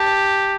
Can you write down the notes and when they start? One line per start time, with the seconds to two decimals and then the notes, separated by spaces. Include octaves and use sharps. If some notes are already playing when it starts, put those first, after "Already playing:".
Already playing: G4 A5